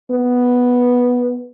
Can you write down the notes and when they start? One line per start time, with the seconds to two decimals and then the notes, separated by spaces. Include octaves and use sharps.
0.11 B3